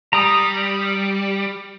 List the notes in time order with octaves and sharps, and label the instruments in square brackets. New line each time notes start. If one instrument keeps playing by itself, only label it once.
[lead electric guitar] G3 [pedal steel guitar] A#5 D#6